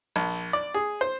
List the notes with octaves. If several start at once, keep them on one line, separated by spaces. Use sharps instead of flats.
A#1
D5
G#4
C5